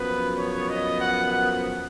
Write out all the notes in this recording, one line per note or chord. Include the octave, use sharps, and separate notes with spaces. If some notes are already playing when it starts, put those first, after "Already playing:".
Already playing: F#2 F3 B3 B4
C#5
D#5
F#5
F#5